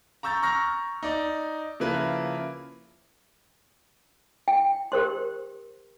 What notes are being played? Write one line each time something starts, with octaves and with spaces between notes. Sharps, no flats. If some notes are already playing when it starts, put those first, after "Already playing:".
A#5 C#6 E6 G6 A6
A#5 C#6 F6 A#6
D#4 D5
C#3 F3 A#3 E4 B4
G5
G4 A#4 C5 C6